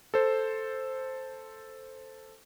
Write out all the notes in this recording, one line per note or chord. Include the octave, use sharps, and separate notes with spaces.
A4 C5